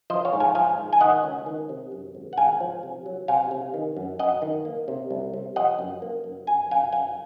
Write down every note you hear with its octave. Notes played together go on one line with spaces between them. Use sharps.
F3 C5 D#5
C#5 F5
G#2
F5 G#5
F3 F5 G#5
G#2
G#5
D#3 D#5 F#5
C#2
D#3
C3
F#2
G#1
F#5
G#1 F5 G#5
F3
C3
F#3
C3 F5 G#5
C3
D#3
F#2
F#2 D#5 F#5
D#3
A#3
C3
C2
C3
F3 D#5 F#5
F#2
A#3
F#2
F#2 G#5
F#2 F5 G#5
F#2 F5 G#5